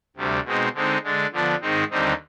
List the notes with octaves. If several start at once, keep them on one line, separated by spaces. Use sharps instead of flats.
D2 C3 G3
B2 G#3 C4 D#4
D3 G#3 C4 D#4
D3 G#3 D4
D3 F3 B3 D4
G#2 D#3 G#3 C4 D#4
D#2 D3 G3 C4 D#4